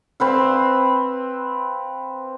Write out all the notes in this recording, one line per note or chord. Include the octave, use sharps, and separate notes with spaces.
C4 B4 F5